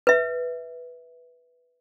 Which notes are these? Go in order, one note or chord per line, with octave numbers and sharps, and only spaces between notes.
B4 E5